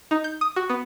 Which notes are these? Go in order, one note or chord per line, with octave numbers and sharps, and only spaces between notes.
D#4
G6
D#6
F#4
B3